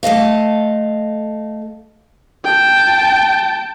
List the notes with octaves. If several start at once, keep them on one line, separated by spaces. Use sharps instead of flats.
A3 A4 D#5 F5
G5 A5